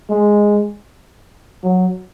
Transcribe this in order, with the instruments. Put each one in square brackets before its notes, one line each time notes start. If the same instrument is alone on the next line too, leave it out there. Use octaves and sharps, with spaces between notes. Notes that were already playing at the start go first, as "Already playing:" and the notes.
[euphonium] G#3
F#3